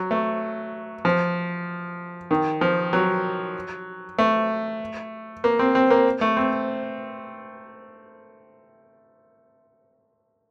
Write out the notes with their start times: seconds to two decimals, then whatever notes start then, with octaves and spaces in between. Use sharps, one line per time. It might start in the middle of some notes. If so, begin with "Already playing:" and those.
Already playing: F#3
0.11 A3
1.05 F3
2.31 D#3
2.61 F3
2.93 F#3
4.19 A3
5.44 A#3
5.59 C4
5.75 C4
5.90 A#3
6.21 A3
6.37 C4